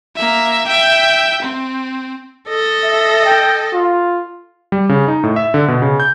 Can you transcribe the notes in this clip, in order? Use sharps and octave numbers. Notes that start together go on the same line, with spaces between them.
A#3 E5
E5 G5
C4
A4 D#5
E5
G5
F4
G3
C#3
D#4
A2
E5
D3
B2
C#3
G6